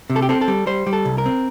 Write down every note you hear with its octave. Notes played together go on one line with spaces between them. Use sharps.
C3
A4
G4
C4 A4
A4
G3
G3 C5
G3
A4
C2
A#4
C4